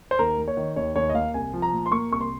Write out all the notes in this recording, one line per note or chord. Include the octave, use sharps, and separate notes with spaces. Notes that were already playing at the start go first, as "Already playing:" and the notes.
C5
D#2 A#4
A#3
C#5
D#3
D#2 C#5
D#2 C#5
D#5
A#3 F5
C2 G#5
F3
A#5
A#2
C6
A#3 C#6
C2 C#6
C6